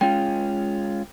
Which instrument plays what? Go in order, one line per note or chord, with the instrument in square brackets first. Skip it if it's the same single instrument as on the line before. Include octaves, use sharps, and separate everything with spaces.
[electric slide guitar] G#3 C#4 F4 [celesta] G5